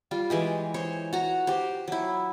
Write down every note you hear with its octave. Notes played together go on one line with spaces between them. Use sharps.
G3 F4
E3 G#3 G4
C5 C#5
F#4 A#5
G4 C5
F#3 E4